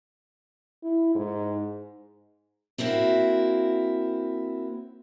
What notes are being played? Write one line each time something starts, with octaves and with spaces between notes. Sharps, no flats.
E4
G#2
A#3 C4 E4 F#4